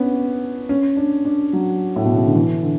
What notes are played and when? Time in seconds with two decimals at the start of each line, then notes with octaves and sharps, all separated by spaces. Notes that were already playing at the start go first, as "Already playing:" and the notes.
Already playing: B3 C#4 D4
0.69 C#4
0.97 D4
1.25 D4
1.53 F#3
1.96 A2
2.05 B2
2.16 C#3
2.25 D3
2.35 E3
2.62 D3